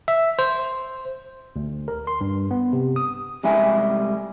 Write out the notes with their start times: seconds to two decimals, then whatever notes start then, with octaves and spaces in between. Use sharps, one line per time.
0.08 E5
0.39 C5
1.56 D2
1.88 A#4
2.07 C6
2.21 G2
2.51 B3
2.73 C3
2.96 D#6
3.43 C3 G3 G#3 E5 G#5